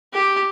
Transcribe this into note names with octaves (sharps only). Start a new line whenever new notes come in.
G4